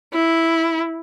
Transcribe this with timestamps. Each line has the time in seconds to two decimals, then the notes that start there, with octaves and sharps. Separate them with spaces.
0.13 E4